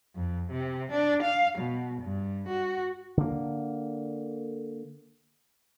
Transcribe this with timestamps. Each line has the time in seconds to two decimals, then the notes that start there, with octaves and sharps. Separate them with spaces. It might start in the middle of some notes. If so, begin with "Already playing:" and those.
0.15 F2
0.51 C3
0.92 D4
1.22 F5
1.58 B2
2.02 G2
2.48 F#4
3.17 D3 A#3